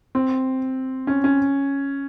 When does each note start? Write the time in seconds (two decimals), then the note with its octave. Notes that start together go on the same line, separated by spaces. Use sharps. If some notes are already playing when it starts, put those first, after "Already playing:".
0.15 C4
1.07 C#4
1.24 C#4